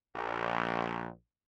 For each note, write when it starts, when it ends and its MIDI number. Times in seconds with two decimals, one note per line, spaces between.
0.15 1.09 34